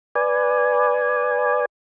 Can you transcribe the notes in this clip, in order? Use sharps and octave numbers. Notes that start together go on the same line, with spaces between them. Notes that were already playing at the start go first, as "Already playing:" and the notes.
B4 D5 G#5